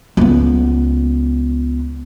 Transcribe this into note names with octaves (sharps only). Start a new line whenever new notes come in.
C#2 B3